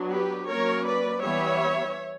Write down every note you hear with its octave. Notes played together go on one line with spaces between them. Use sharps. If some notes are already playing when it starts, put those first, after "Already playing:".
Already playing: F#3 B3 D4
G4 B4
F#3 A#3 C#4 A#4 C#5
B4 D5
E3 G3 B3 C#5 E5